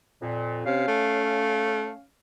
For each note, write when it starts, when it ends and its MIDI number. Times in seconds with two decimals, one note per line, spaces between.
0.22 0.66 41
0.22 0.66 46
0.66 0.85 48
0.66 2.05 61
0.66 2.05 77
0.88 1.91 57